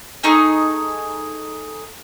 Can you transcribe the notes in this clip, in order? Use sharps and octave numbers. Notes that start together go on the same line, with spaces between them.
A3 D#4 G#4 C#6